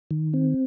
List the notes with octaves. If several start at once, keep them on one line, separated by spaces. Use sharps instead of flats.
D#3
C4